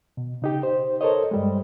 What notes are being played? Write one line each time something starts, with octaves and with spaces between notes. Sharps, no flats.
B2
C#3 D#4 G4
C5
A4 A#4 C5 C#5 D#5
G2 G3 G#3